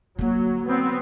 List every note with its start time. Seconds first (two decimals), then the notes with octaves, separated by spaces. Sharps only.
0.19 D3 F#3 A#3
0.68 B3 C4